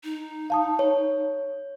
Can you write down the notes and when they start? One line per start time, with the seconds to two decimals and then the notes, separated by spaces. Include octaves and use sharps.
0.04 D#4
0.50 F5 A5 D#6
0.79 C#5